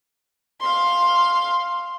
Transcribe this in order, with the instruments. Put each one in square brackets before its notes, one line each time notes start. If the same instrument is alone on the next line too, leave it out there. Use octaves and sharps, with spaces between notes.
[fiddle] F5 C6